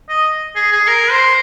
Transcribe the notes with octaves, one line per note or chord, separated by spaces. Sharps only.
D#5
G#4
G#4
A#4
C5